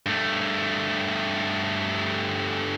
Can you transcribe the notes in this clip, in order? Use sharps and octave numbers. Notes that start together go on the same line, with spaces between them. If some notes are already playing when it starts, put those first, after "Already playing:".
G2 A3